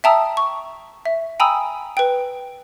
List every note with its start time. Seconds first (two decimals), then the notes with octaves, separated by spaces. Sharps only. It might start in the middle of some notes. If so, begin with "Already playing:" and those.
0.04 E5 G5 A5 A#5 D#6 E6
0.37 C#6
1.06 E5
1.40 G5 G#5 A#5 B5 D#6 E6
1.97 B4 G5